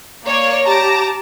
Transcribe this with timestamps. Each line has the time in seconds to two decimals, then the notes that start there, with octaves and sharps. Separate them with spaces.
0.24 A#3 C#5 D5
0.66 G4 A5 A#5 D6